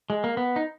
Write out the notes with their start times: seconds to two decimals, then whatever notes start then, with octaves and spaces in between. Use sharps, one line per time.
0.10 G#3
0.24 A#3
0.37 B3
0.56 D#4